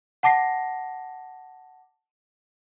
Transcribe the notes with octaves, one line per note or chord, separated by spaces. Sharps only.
F#5 A5 D6 A#6 C7